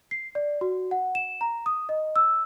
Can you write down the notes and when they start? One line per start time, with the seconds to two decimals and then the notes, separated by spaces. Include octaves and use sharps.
0.11 C7
0.35 D5
0.61 F#4
0.91 F#5
1.15 E7
1.41 A#5
1.66 D#6
1.89 D#5
2.16 E6